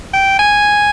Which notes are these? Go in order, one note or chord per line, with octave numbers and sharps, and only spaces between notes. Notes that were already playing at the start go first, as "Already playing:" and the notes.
G5
G#5